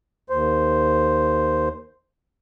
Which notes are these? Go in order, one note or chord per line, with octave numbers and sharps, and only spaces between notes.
D#2 C5